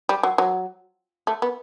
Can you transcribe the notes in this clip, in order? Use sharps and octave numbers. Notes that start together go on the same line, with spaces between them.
G3
F#3
F#3
A3
B3